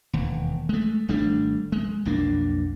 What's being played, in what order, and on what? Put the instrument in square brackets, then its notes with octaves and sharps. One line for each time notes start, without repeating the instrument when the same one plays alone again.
[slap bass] E1 D#2
G#3 A3
G#1 G3 A3 D4
G#3
B1 F2 A#3 D4